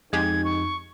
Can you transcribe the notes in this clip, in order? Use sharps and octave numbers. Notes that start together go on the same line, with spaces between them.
F2 G#3 D#4 G4 G#4 G#6
C#6